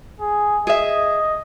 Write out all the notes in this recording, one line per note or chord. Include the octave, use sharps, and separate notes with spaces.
G#4
G#4 D#5 E5